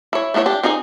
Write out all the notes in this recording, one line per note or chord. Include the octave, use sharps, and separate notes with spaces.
E4 C#5
A3 B3 E4 B4 C#5
D4 G4
C4 D#4 G#4 D#5 G#5